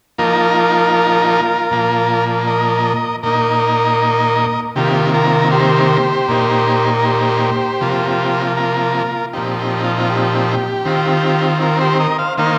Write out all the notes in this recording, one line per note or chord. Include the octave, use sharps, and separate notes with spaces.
F3 A#3 D#4 F4 A#4
A#2 F3 A#3
A#4 D#5
A#2 A#3 D#4 A#4 D#5
C3 D#3 A#3 F4 G4
F4 A#4
G4 C5
A#2 A#3 D#4
A#4
G4 C5
C3 F3 A#3 F4
F4 A#4
A#2 F3 C4 D#4 G4
G4
F4
F4
G4
D#3 C4 F4
F4 A#4
G4 C5
A#4 D#5
C5 F5
D#3 A#3 D#4 C5 F5